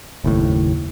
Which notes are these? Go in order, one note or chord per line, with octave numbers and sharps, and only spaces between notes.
F#1 D#2 A2